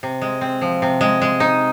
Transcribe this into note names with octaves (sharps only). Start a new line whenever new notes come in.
C3
G#3
C4
F3
C3
G#3
G#3
D#4